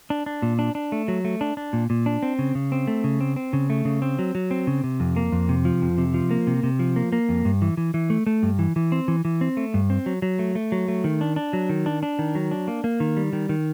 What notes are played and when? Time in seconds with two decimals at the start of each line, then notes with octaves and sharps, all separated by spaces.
0.10 D4
0.26 D4
0.42 A#2
0.59 D4
0.75 D4
0.92 A3
1.08 F#3
1.25 A3
1.41 D4
1.57 D4
1.73 A#2
1.90 A#2
2.06 D4
2.23 C4
2.39 C#3
2.55 C#3
2.72 C4
2.87 A3
3.04 C#3
3.21 C4
3.36 C4
3.53 C#3
3.70 A3
3.85 C#3
4.02 C4
4.19 F#3
4.35 F#3
4.51 C4
4.67 C#3
4.84 C3
5.00 F2
5.16 A#3
5.32 F2
5.49 C3
5.65 F3
5.82 F2
5.98 C3
6.14 F3
6.31 A#3
6.47 C3
6.63 C3
6.79 F3
6.96 A#3
7.12 A#3
7.29 F2
7.45 G2
7.62 E3
7.77 E3
7.94 E3
8.10 A3
8.27 A3
8.43 G2
8.59 E3
8.76 E3
8.92 C4
9.08 E3
9.25 E3
9.41 C4
9.57 A3
9.74 G2
9.90 C4
10.06 F#3
10.22 F#3
10.39 A3
10.55 A3
10.72 F#3
10.88 A3
11.04 D#3
11.21 D4
11.36 D4
11.53 F#3
11.69 D#3
11.86 D4
12.03 D4
12.19 D#3
12.35 F#3
12.51 D4
12.68 A#3
12.84 A#3
13.00 D#3
13.17 G3
13.33 D#3
13.49 D#3